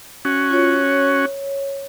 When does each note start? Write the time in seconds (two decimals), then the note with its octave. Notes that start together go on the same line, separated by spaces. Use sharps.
0.25 C#4 F#4
0.51 F4 C#5
0.73 C#5